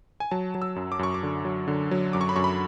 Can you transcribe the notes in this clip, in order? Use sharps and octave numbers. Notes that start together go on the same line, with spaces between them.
G#5
F#3 A5
F#3
E6
F#2
D6
F#2 C#6
D6
D3
F#3
D3
F#3
F#2 D6
C#6
B5
F#2 C#6
B5